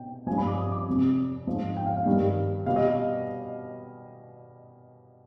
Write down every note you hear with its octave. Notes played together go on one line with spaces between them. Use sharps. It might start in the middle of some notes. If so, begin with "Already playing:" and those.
Already playing: B2 G5
G2 F3 G#5
B5
D6
D#6
D6
F2 C3 G3
G#2 F3
G5
F5
F5
G2 D#3 G3
B2 G3 F5
D#5